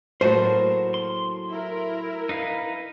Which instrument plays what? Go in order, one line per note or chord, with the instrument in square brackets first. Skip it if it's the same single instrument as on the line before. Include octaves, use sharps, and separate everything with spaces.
[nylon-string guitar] A2 F#3 A#3 [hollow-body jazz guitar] F#4 C5 [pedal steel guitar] A#4 A5
[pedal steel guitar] C6
[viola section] E4 A#4
[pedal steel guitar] D#4 B4 F5